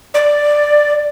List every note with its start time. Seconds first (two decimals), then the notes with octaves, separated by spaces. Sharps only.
0.14 D5